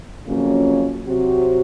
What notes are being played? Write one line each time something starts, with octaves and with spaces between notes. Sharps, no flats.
F2 C#3 F#3 A#3 C#4
C3 F#3 C4 F#4